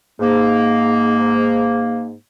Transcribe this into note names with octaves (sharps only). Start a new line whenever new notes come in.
G#2 A#3